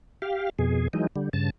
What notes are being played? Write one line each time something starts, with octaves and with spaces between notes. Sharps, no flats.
G4 F5
F2 B2 G#4
E3 F#3 G#3 D#4
D3 G3
G2 C#3 A5